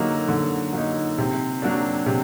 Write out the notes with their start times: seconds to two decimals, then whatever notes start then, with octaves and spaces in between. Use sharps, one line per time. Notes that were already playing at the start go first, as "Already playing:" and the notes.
Already playing: D3 F#3 A#3 D#4
0.29 D3
0.73 F#3 A#3 D#4
1.18 C3
1.62 F#3 A#3 D4
2.06 C3